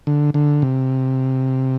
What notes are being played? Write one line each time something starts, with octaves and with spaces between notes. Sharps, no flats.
D3
D3
C3